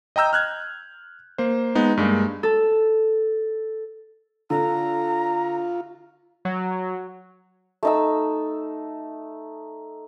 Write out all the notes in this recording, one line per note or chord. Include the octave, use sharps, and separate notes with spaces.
D#5 G5 A#5 E6 G6
F6 F#6 G#6
A#3 C5
G#3 B3 D#4
G2 G#3 A#3
A4
D3 F4 A#5
F#3
A3 D#4 E6